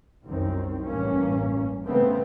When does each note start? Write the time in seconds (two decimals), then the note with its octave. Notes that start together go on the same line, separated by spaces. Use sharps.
0.25 C2 F#2 D#3 C4
0.86 A1 G2 A#3 C#4
1.85 C#3 A3 B3 C4